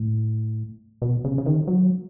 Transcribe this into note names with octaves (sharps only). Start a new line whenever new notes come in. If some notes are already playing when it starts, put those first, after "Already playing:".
Already playing: A2
B2
C#3
C#3
D#3
F#3